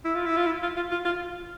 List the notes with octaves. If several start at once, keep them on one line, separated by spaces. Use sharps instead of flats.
E4
F4
E4
F4
E4
F4
F4
F4
F4